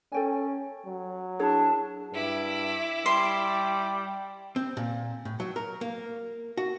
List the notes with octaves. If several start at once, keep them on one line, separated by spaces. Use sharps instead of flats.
C#4 A4 G5 G#5
F#3
D4 E4 G#4 C#5
G2 E4 D6
G3 C6
C4
A#2
A2
F#3
A#4
A#3
F#4